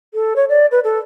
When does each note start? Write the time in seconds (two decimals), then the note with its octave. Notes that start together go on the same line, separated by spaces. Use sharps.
0.14 A4
0.36 C#5
0.49 D5
0.72 B4
0.84 A4